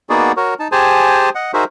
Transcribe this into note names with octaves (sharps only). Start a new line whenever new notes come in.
A#3 B3 D#4 F#4 G#4 D5
F#4 A#4 C#5
D#4 A5
G4 G#4 C5 G#5 A5
D#5 F#5
D#4 F#4 G#4 A#4 C5 E5